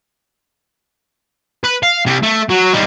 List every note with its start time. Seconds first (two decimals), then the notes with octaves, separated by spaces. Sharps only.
1.64 B4
1.83 F5
2.06 C3 G3
2.23 A3
2.49 F#3
2.73 G3 D#4